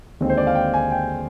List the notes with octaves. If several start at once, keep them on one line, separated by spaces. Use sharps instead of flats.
D#2 D3 G#3 C4 D#4
C5
D5
F5
G5
G#5
G5